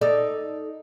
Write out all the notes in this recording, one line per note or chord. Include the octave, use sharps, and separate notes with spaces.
D#4 A4 D5